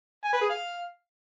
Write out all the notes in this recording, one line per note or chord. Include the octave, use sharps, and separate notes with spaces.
G#5
B4
G#4
F5